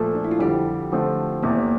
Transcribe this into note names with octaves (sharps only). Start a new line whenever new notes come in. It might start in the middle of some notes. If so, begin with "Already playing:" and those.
Already playing: A#2 F3 A3 A4
D4
E4
F4
F2 D3 G3 G4
D3 F3 A3 C4
F1 E2 C3 A#3